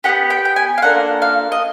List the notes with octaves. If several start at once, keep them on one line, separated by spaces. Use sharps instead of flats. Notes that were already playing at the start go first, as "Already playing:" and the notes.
B3 D#4 G4 F#5
G5
G5
G#5
F5
A#3 D4 F4 A4 F#5
F5
D#5